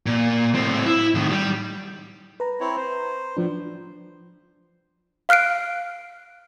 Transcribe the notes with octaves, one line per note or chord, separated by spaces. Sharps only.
A#2
A2 C4
E4
A2 D#3
G3
B4 A#5
C4 E4 C#5
C5
A2 F3 D4
F5 F6 F#6 C7 D7